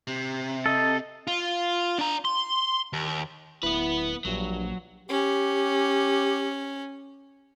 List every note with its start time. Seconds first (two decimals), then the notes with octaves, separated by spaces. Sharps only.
0.07 C3
0.66 A4 D#5
1.27 F4
1.99 D4 A#5
2.25 C6
2.93 D#2
3.63 D1 B3 E4 B4
4.25 A#1 G2 F#3
5.09 C#4 G4